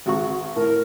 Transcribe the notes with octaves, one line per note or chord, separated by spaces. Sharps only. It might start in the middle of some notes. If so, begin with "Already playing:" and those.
G#1 F#4 C#6
A2 A#4